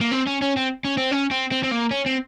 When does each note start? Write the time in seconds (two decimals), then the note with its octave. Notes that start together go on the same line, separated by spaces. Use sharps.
0.01 A#3
0.12 C4
0.27 C#4
0.42 C#4
0.57 C4
0.85 C#4
0.97 C4
1.11 C#4
1.31 C4
1.51 C4
1.63 C4
1.71 A#3
1.91 C#4
2.06 C4